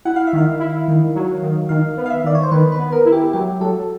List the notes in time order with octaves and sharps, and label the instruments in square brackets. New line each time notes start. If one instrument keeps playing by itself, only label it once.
[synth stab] E4 [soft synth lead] F#5
[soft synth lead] F5
E5
[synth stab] D#3 [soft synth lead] F5
[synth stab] E4
D#3
F#3
D#3
[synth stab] D#3 [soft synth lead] F5
[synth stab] B3
[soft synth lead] F5
E5
[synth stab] D#3 [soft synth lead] D5
[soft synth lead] C#5
C5
[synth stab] D#3 [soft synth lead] B4
[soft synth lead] B4
[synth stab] B3
[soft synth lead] A#4
[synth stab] E4
[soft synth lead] G4
[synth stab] F#3 [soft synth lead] G4
[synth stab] F#3 [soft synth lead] A4